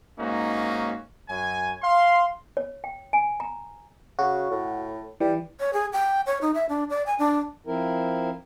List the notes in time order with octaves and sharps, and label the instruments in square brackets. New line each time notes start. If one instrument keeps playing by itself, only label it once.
[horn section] G#2 A#3 C#4 D#4 F#4
F#2 G#5
F5 C6
[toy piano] C#5
G5
G#5
A#5
[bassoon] C#3 [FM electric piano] F#4
[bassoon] A2
[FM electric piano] E3 [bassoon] G3
[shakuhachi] C#5
G#4
G5
C#5
D#4
E5
D4
D5
G#5
D4
[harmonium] F3 C4 E4 A#4